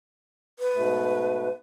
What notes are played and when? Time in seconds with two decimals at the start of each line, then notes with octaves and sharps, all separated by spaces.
0.59 B4
0.75 G#2 B2 A3